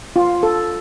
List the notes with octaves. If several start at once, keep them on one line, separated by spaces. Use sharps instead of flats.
F4
A4